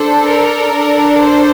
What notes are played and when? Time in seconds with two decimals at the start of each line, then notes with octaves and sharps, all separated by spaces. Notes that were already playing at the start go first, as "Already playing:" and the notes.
Already playing: D4 A4 C5
0.25 A#4
0.73 D4
0.78 A4
1.22 C5